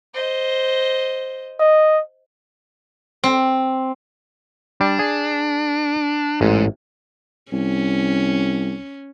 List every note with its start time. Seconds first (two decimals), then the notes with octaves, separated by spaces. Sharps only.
0.14 C5 D#5
1.60 D#5
3.24 C4
4.81 G3 D4
4.99 G#4
6.41 A1 G#2
7.52 C2 C#4